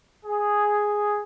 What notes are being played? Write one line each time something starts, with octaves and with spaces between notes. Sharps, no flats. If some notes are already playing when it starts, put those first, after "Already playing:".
G#4